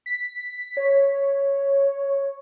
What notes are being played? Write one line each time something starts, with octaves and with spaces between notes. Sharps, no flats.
B6
C#5